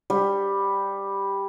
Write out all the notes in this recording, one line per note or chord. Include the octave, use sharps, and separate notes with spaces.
G3